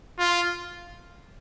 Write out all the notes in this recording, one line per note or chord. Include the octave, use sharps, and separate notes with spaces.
F4